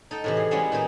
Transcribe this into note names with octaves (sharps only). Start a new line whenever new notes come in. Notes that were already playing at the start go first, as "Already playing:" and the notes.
D#4 A4 G5
A2 C3 E3
G#4
G3 G#3 B3 C#4 E4 F#4
A#2 E3 D#4 G5